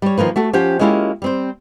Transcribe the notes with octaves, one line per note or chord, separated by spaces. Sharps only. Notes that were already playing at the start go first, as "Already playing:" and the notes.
G3 C#5
D#3 F3 A#3 B4
A3 F#4 A4
F3 C#4 G4 C5 F#5 G5
G#3 A#3 C#4 E4 F4 G4
G3 C4 C5